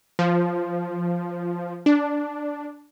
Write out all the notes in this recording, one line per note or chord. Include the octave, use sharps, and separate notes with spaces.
F3
D4